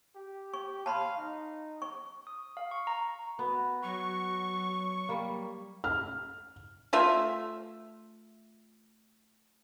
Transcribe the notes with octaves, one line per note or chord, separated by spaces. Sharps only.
G4
C#6
F5 A5 B5 C6
D#4
C#6
D#6
F5
C#6
A#5
B3 F#4
F#3 C#6
G3 A#3
F6
A3 F4 E5